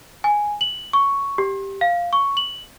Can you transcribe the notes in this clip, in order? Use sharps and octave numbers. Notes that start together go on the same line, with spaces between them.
G#5
F#7
C#6
G4
F5
C#6
F#7